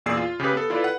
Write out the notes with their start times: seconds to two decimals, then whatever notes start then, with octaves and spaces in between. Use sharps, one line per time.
0.06 E2 A#2 G#4 D5 E6 C7
0.17 F4
0.40 C#3 G4 G#4 B4
0.53 B3 A4
0.70 E4 F4 A4 B4 D5
0.83 B4 F#5